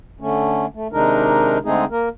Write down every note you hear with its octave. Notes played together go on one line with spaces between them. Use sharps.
D3 A3 C#4
A3
C3 D#3 G#3 D4 D#4 A#4
D3 G#3 A3 C4 D#4 G#4
A#3 A#4